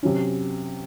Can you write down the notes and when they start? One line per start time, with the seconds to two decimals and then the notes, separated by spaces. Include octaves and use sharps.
0.03 C3 F#3 C#4